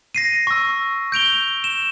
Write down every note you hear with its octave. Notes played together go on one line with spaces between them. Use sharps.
A#6 C7 D#7
C#6 E6
G6 D7 F7 G7
E7